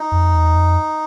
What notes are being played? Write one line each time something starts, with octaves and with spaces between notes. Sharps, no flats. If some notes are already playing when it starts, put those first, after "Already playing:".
Already playing: D#4
F2
E2
F2